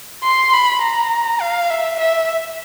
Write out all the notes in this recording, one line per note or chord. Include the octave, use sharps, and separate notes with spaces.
C6
B5
A#5
F5
E5
E5